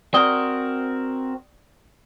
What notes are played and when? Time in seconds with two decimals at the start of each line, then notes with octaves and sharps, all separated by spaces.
0.14 C4 F#4 A#4 D5 D#6 G7